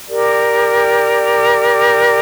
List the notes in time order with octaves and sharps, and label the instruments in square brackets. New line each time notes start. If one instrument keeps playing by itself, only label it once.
[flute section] G4 A#4 D5